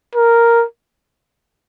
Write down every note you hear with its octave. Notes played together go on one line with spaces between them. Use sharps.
A#4